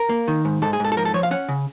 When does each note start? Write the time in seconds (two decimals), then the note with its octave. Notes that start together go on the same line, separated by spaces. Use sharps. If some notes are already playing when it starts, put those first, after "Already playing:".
Already playing: A#4
0.09 A#3
0.28 D#3
0.45 G#2
0.62 G#2 A4
0.73 G#4
0.80 G#2 A4
0.92 A4
0.97 F3 A#4
1.05 A4
1.14 F3 C#5
1.23 F5
1.31 C#4 F#5
1.49 C#3